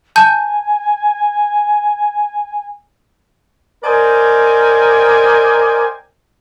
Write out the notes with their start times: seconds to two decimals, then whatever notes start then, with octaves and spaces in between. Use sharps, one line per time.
0.16 G#5 A5 G6
3.84 A#4 C5 D5 D#5 G5 G#5